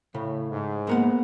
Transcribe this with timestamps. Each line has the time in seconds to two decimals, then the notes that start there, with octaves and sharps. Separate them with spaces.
0.14 A2 C#3
0.51 G#2
0.87 A#2 G#3 A#3 B3 A#4 F#5